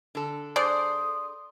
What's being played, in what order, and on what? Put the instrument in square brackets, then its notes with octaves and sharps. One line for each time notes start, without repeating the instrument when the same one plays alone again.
[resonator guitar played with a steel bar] D3 A4
[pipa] D4 G#4 C5 [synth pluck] D5 [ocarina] D#6